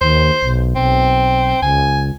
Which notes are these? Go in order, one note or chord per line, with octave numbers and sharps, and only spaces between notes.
D#2 C5
B1
B1 C4
C#2 G#5